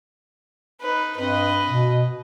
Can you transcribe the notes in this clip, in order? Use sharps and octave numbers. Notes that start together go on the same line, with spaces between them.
D#4 B4
G2 C4 B4 D#5
B2